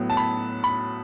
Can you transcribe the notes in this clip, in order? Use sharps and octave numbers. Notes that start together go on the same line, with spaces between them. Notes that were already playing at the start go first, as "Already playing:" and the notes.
Already playing: A2 F#3 B3
A5
B5
B5